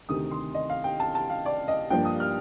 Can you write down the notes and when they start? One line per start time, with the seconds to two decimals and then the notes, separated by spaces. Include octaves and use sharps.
0.09 D2 C3 D#3 D#6
0.31 C6
0.54 D#5
0.69 F5
0.84 G5
1.00 A5
1.15 A5
1.30 F5
1.46 D5
1.68 D#5
1.90 G2 F3 A#3 D4 G5
2.05 D#6
2.20 F6